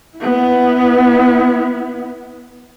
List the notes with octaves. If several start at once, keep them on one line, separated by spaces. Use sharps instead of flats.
B3 E4